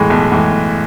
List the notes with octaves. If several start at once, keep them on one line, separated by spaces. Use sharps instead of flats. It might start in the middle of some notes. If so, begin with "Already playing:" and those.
Already playing: B1 A2 E3 G#3
B1
A2 E3 G#3